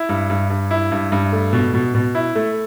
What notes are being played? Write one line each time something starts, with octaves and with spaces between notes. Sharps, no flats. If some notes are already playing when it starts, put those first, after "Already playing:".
Already playing: E4
G2
G2
G2
E4
G2
G2
A3
B2
B2
B2
E4
A3